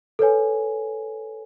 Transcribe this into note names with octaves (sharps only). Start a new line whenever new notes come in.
A4 B4 C#5 G#5